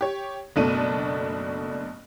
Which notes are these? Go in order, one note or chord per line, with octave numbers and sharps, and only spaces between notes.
G4 C#5
F#1 B2 A3 D4 A5 D#7